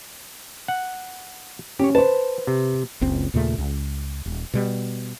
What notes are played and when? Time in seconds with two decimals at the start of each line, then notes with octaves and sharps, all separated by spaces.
0.68 F#5
1.79 C#4 G4 C#5
1.95 B4 C5 A5
2.47 C3
3.01 F#1 C#2 C4
3.34 D#2 A#2 C#3 A3
3.58 C#2
4.26 D#1
4.54 B2 G3